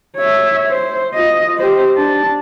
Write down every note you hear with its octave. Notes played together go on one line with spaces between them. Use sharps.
C#5 E5
C5
F4 D#5
G4 C5
D4 A5